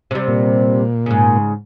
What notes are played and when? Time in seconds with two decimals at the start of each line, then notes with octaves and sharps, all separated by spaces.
0.11 C3 G3
0.28 A#2
1.06 G#2 C#3